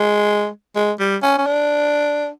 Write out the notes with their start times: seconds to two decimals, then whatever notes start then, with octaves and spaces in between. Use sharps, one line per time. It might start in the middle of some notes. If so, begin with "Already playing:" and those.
Already playing: G#3
0.75 G#3
1.00 G3
1.23 C#4
1.38 C#4
1.46 D4